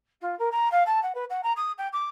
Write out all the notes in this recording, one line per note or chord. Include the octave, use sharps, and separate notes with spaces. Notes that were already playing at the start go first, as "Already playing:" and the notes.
F4
A#4
A#5
F5
A5
F#5
B4
F#5
A#5
D#6
G5
D6